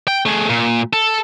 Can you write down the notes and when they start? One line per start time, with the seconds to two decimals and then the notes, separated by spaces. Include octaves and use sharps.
0.08 G5
0.26 A3 G#4
0.49 A#2
0.93 A4